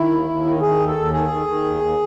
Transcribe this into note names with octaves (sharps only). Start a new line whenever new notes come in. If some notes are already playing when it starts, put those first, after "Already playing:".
Already playing: D#3 E4
D#2
D#2
D#3
D#3 G#4
D#2
A4
D#2
D#3 G#4
D#3
D#3
D#2
D#2